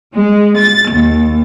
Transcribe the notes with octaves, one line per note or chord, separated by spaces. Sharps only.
G#3
A6
D#2